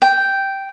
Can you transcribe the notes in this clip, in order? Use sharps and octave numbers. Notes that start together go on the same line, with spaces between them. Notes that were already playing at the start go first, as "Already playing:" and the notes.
G5